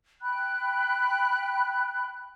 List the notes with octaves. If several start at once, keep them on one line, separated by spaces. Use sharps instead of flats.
G5 B5 F#6